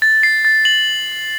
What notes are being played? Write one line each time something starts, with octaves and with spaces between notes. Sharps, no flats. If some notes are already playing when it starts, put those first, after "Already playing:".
A6
C7
A6
F#7